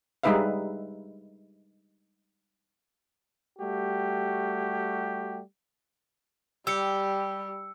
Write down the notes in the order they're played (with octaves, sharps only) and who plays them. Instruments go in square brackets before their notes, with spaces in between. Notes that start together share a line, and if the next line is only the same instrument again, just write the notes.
[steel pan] G3 G#3 D#4 B4 E5 F5
[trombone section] G3 A3 F#4 G4
[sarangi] G3 [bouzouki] G4 [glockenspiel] E6 C#7